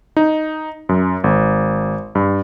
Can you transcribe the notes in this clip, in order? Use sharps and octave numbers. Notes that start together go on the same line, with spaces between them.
D#4
F#2
G#1
G2